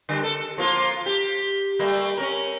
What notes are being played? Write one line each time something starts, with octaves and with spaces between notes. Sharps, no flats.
D3 G3 D4
A4
F3 A#3 F4
G4
G3 A3 A#3
C#4 A#4